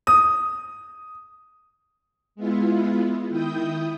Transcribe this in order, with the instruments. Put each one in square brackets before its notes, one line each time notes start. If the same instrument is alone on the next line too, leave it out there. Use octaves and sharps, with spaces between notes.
[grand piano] D#6
[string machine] G#3 B3 E4 F4
D#3 E4 G5 D#6 G6